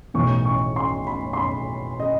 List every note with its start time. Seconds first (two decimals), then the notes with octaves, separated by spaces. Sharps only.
0.14 B1 A2 E3 C#6
0.45 C#6
0.76 C6
1.07 B5
1.33 C6
1.38 B5
2.00 D#5